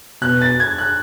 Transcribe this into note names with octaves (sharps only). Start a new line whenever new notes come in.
B2 F#6
A6
G#6
F#6